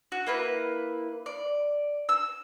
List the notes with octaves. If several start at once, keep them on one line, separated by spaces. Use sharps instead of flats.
F#4
A#3 E4 B4
D5
E6